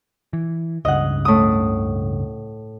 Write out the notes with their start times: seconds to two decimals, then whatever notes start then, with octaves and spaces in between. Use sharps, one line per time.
0.33 E3
0.85 C#2 G2 C#3 D#5 F#5
1.25 A2 D#6